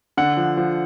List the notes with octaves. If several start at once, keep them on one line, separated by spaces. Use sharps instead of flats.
D3 F#5
F3
F3